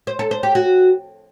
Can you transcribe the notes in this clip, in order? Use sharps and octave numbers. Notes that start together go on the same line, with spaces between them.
C5
A4
C5
G4
F#4